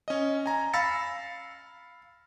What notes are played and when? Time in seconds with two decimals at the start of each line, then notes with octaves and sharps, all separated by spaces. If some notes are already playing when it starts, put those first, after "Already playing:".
0.08 C#4 D#5
0.46 G#5 A#5
0.73 F5 B5 E6 A6 A#6 C#7